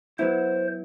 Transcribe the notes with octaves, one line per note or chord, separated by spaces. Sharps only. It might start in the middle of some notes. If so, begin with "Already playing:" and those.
F#3 B3 E4 C5